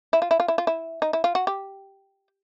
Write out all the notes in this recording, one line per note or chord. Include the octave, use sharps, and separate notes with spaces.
E4
F4
E4
F4
E4
F4
E4
D#4
E4
F4
F#4
G4